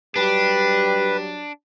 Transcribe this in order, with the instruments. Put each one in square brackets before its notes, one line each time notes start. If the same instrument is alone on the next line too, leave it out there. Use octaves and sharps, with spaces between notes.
[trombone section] F#3 G3 G4 [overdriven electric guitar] D4 [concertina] B4